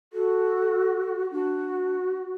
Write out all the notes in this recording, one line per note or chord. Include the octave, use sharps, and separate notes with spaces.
F#4 A4
D4 F#4